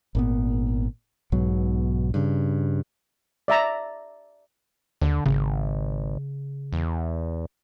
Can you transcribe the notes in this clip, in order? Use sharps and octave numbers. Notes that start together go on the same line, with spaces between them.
G#1 A#2 B3
B1 G#2 B2 F#3
G2 C#3
D5 E5 A#5
D#2 D3
G#1 C#3
E2